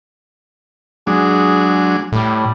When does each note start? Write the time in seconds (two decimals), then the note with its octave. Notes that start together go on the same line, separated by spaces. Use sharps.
1.07 F#3 G#3 D4 G#4
2.12 A2 G3